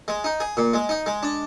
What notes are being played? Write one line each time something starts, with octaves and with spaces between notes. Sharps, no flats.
G#3
D#4
G#4
A#2
G#3
D#4
G#3
D4